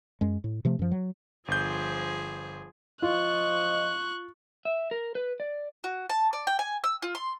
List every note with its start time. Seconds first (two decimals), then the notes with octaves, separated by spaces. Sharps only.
0.21 F#2 G#3
0.44 A2
0.65 C3 F3 A3
0.79 F#2 F3
0.91 F#3
1.48 G1 F3 G#4 C5 G6
3.02 F3 F4 D#5 C#6 F#6
4.65 E5
4.91 A#4
5.15 B4
5.40 D5
5.84 F#4
6.10 A5
6.33 D5
6.47 G5
6.59 G#5
6.84 E6
7.02 F4
7.15 C6